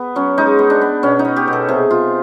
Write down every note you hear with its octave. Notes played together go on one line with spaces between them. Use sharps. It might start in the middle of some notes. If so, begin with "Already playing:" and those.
Already playing: B3
F#3 C#4
G#3 D#4
B3
D4
B3
B2 C#4
D#4
B3
G4
B2
A4
C3 G#4
B3 F4